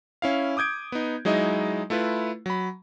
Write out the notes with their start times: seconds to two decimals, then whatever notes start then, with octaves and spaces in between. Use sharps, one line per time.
0.22 C#4 E4 F5
0.57 D6 D#6 G6 G#6 D7
0.92 B3 D#4
1.25 F#3 G#3 D#4 E4 D#5
1.90 A3 E4 F4 B4
2.46 F#3 B5